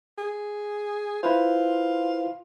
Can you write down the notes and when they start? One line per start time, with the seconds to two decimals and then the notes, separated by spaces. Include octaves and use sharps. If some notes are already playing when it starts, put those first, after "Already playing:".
0.18 G#4
1.23 E4 F4 B4 C5